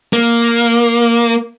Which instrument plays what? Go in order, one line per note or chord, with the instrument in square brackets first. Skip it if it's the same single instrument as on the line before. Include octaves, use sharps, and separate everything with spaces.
[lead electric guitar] A#3